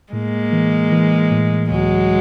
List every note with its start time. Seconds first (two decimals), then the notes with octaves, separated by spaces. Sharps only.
0.13 A2 G#3 A#3
0.53 E3
0.92 E3
1.31 A2
1.71 C#2 F#3 G#3